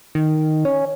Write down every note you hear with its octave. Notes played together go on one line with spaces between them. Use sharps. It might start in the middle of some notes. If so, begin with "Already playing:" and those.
D#3
C#4